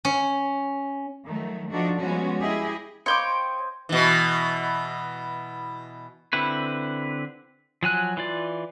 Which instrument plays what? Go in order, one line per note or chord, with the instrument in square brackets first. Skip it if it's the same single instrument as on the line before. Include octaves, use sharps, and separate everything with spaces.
[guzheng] C#4
[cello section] D#3 F3 F#3 A3
F3 D4 D#4 F#4 A4
F3 G3 G#3 B3 C#4 F#4
E4 G4 G#4 D#5
[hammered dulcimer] C5 D#5 [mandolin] C#5 G5 D6 [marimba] F5 B5 C6
[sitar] B2 E3
[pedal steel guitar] D3 C4 E4 B4
F3 F#3 G#5 F#6
E3 F4 D5